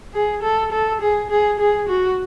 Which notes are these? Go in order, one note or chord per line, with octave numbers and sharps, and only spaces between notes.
G#4
A4
A4
G#4
G#4
G#4
F#4